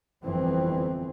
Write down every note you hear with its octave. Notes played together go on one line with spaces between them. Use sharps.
G1 F2 E3 C4